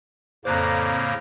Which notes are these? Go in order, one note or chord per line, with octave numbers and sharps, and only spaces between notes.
F2 A2 C#3 A#3 C5 D5 A#5 F#6